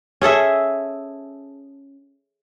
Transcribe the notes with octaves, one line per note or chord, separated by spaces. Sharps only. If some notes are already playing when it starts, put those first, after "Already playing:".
C#4 G#4 A4 E5